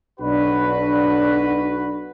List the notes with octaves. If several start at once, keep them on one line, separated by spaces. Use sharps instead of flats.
B1 D4 F#4 B4